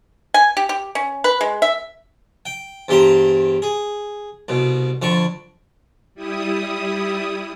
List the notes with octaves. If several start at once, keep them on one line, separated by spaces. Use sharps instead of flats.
G#5
G4
G4
C#4
B4
G#3
E5
G5
E2 G2 G4 C5 A#5
G#4
C2 B2
F2 D3 C#6
G3 E4 D#6